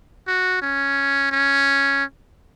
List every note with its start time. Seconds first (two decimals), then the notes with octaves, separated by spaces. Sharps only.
0.28 F#4
0.62 C#4
1.32 C#4